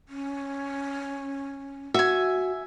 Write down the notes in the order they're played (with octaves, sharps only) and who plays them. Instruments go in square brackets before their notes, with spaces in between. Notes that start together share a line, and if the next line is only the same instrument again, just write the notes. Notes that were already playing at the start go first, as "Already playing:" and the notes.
[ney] C#4
[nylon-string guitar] F#4 [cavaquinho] E5 G#5